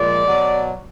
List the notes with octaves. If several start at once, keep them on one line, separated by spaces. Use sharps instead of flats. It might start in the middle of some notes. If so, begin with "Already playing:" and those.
Already playing: A#2 F3 G#3 D5
B2 F#3